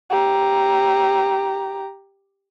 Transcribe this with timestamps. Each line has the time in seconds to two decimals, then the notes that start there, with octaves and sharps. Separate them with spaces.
0.10 G4 A#5